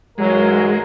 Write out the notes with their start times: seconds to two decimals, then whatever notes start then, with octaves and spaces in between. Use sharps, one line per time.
0.18 G#2 E3 F#3 G#3 A#4